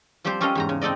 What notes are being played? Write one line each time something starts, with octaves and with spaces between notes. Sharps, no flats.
F3 G3 C4 G4 C5
G3 C#4 A4 A#4 D#5 F5
E2 G#2 A#5
C#3
C4 D#4 A4 D5 D#5